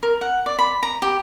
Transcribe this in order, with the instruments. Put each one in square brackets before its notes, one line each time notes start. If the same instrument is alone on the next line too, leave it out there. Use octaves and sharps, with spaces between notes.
[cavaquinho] A#4
F#5
D5
B5
A#5
G4